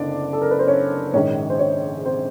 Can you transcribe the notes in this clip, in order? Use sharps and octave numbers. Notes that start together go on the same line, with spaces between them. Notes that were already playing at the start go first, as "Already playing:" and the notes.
Already playing: F#1 F#2 D3 B3 D4 D5 D#5
A4
A#4
B4
C5
C#4 C#5
A#1 G#2 D#3 C#4 C#5
C5
C#4 C#5
C4 C5